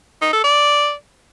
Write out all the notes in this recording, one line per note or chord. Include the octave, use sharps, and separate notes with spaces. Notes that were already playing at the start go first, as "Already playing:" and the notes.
D#4
A4
D5